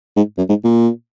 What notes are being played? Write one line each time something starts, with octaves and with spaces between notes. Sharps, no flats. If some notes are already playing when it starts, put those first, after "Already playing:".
G#2
F#2
G#2
A#2